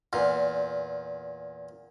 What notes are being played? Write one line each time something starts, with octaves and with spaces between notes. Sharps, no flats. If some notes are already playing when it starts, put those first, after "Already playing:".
E2 A#2